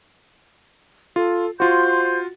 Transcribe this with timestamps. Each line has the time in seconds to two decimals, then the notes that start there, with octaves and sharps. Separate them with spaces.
1.16 F4 A4
1.60 F4 F#4 C5 C6 G6